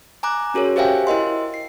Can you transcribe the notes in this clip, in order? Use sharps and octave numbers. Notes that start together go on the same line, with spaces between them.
G#5 A#5 D6 F#6
C#4 F#4 G#4 A#4 C#5
G4 C5 E5 F5 G5 G#5
E4 A#4 D#5 C6
C7